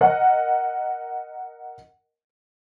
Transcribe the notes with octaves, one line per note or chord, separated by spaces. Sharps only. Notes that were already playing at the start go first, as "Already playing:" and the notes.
A#4 D#5 F#5